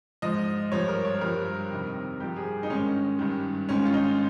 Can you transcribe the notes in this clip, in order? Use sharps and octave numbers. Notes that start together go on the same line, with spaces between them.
G#2 F3 D#5
G2 F3 C#5
A#4
C#5
G2 F3 A#4
F2 C3 D#3
G2 F3 G4
G#4
D#4
G#2 D#3 C#4
G2 D#3
G#2 D#3 C#4
F4
D#4